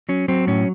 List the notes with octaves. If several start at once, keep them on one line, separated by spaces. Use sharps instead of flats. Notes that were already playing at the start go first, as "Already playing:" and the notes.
F#3 C#4
F#3 C4
A2 C#4